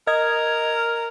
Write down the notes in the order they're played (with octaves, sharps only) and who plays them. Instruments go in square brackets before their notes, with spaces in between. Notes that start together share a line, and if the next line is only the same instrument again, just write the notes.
[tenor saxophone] A#4 [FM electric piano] D#5 G#6